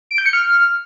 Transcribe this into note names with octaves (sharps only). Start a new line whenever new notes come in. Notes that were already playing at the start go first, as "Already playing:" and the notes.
D7
G6
C#7
F6